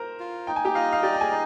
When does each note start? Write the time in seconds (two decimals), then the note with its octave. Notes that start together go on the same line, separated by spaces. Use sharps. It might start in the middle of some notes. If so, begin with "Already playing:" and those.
Already playing: A#4 C5 A#5
0.20 F4
0.47 D#4 G5
0.56 G#5
0.65 G4 G5
0.75 F4 D#5 F5
0.93 F5
1.03 G4 D5 G5
1.14 G5
1.21 G#4 G#5
1.30 D#4